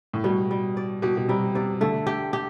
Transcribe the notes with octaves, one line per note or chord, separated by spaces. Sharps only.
A2
B2 G3
G3
D5
B2 G4
B2
C3 G3
C3 D5
D3 A3
G4
G4